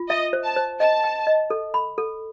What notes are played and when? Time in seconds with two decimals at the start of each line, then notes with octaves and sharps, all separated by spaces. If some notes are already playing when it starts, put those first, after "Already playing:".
Already playing: F4
0.09 D#5 E5
0.33 C5
0.44 A5
0.56 C5
0.80 D#5 A5
1.04 G5
1.27 D#5
1.50 A4
1.74 B5
1.98 A4